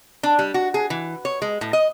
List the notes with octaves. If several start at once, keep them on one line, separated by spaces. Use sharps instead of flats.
D4
G3
F#4
G#4
E3
C#5
G#3
A2
D#5